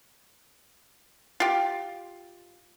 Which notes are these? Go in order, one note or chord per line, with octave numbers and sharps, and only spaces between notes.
F4 G4